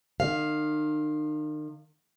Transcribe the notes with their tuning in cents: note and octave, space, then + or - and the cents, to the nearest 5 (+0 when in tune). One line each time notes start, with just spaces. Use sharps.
D#3 -40 F5 +0